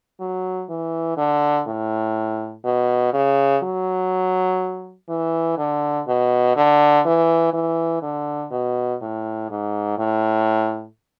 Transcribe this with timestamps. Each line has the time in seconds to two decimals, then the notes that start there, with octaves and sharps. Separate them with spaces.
0.20 F#3
0.70 E3
1.17 D3
1.67 A2
2.65 B2
3.13 C#3
3.63 F#3
5.09 E3
5.58 D3
6.08 B2
6.56 D3
7.05 E3
7.53 E3
8.02 D3
8.51 B2
9.01 A2
9.50 G#2
9.98 A2